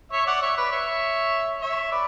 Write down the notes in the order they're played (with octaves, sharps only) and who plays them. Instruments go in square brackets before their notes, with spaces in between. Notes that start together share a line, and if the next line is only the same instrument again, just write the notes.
[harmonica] C#5 E5
D5 F#5
C#5 E5
B4 D5
C#5 E5
C#5 E5
B4 D5